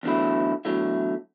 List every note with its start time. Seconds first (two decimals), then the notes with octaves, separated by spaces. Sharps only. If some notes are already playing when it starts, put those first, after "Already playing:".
0.03 E2 D3 F#3 A3 E4
0.65 E2 D3 F#3 A3 E4